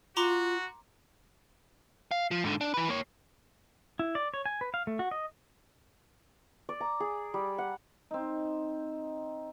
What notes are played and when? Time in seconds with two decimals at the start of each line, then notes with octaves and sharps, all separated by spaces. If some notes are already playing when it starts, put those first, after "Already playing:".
0.17 F4 F#4 A#5 C6 D6
2.11 F5
2.31 F3
2.44 G#2 D3
2.61 D4
2.74 E3 B4
2.88 A#3 C#5
3.99 E4
4.15 D5
4.34 C#5
4.46 G#5
4.61 B4
4.74 F5
4.87 A3
4.99 F#4
5.11 D#5
6.69 D5
6.80 A#5
7.00 G#4
7.34 G3
7.58 F#5
8.11 C4 D#4